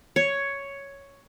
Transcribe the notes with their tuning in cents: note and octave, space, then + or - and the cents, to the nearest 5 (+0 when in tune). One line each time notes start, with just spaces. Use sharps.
C#5 +5